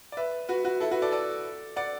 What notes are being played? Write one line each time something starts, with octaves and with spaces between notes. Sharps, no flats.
D5
B4 E5
F#4 B4
F#4 B4
E4 A4
F#4 B4
A4 D5
A4 D5
D5 F#5